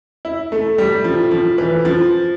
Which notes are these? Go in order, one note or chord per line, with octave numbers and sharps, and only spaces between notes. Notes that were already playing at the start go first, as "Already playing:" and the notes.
E4
A3
G3
F3
F3
E3
F3